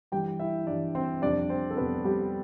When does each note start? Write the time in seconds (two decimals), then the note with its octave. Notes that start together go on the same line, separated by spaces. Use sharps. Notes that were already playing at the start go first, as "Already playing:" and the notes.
0.12 G2 E3 G3 G4 G5
0.40 E4 E5
0.67 G2 E3 G3 D4 D5
0.95 C4 C5
1.22 F2 C3 G3 D4 D5
1.50 C4 C5
1.71 A4
1.77 F2 C3 G3 B3 B4
2.04 G3 G4